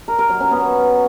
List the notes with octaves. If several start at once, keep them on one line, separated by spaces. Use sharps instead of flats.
A#4
A#4
F#3
C#4
B3